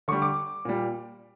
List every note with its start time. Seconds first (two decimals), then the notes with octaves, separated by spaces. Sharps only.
0.08 D3 G3 C#6
0.22 D6
0.65 A#2 G3